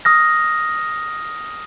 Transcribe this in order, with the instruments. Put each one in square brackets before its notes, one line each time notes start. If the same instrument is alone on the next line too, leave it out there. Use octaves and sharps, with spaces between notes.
[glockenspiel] D#6 F6 A#6